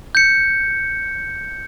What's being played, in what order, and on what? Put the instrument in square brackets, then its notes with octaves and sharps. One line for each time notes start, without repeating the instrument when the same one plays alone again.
[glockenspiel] G6 C#7